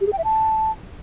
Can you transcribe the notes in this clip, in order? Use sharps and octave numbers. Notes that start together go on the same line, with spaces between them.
G4
G#4
G5
E5
A5